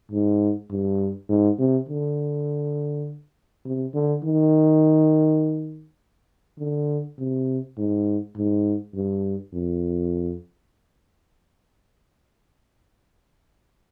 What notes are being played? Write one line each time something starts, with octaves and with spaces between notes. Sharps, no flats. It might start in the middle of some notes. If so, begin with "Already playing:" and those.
G#2
G2
G#2
C3
D3
C3
D3
D#3
D3
C3
G#2
G#2
G2
F2